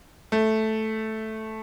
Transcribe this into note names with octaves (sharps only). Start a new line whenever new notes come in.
A3